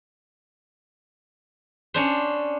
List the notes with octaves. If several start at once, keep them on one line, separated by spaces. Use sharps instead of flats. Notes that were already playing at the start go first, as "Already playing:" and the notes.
C#4 D4 C5